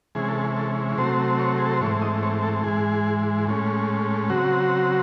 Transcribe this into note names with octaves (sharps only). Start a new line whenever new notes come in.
C3 E3 G#3 C#4 G#4
A4
G#4
A4
C3 F#3 A3 C4 C5
C#5
G#4
A4
C5
G#2 E3 A3 C4 C#5
D#5
C#5
A4
G#2 E3 G#3 G#4
A2 G#3 C#4
C#3 F#3 C4 F#4